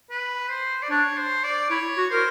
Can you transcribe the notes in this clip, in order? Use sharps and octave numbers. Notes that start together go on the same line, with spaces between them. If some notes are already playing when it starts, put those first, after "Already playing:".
B4
C5
D5
D4 C#5
C5
D5
E4 C#5
F#4
A#4 C5